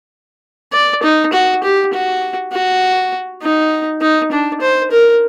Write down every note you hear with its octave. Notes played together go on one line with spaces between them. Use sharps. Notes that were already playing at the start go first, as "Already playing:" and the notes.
D5
D#4
F#4
G4
F#4
F#4
D#4
D#4
D4
C5
A#4